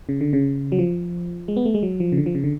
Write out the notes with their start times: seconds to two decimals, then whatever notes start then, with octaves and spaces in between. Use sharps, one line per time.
0.09 C#3
0.21 D3
0.33 C#3
0.72 F#3
0.79 F3
1.48 G#3
1.56 B3
1.65 A3
1.74 G#3
1.83 F#3
2.00 F3
2.12 C#3
2.17 D3
2.26 F3
2.35 C#3
2.44 D3